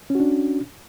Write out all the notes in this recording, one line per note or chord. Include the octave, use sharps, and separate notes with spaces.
C#4 D4 F#4